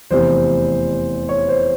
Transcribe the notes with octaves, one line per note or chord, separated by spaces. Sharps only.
F1 E2 C3 E3 C5
C#5
C5